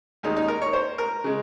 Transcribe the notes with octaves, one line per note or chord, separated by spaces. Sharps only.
D#2 D#3 G#3 D#4
D#4
A#4
C#5
C5
A#4
C#3 G#3